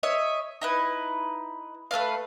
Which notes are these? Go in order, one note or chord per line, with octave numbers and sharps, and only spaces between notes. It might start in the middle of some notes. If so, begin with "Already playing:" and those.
C#5 D#5 E5
D#4 E4 B4
A3 C4 B4 F5